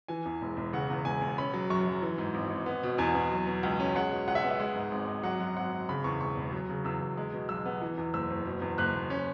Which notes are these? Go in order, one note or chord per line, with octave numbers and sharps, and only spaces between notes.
E3 G#5
E2
E1
E1
C#3 F#5
E2
E1 G#5
E1
C#4 B5
F#3
F#2 C#6
F#2
E3
G#2
G#1
G#1
B3
B2
E2 G#5
E2
F#3
B2
C#2
C#4
G#3 F#5
B2
C#2 F#5
E5
B3
E5
G#3 F#5
G#2
G#1
G#1
F#3 F#5
F#2
G#1 F#5
G#1
C#3 B5
E2 C#6
E1 C#6
E1
F#3
C#3
E2 E6
E2
G#3
B2
B1 E6
B3
E3
E2
F#1 E6
F#1
B2
E2
F#1 F#6
F#1
C#4